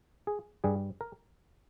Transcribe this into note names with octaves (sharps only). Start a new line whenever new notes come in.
G#4
G2 G3 G#4
A#4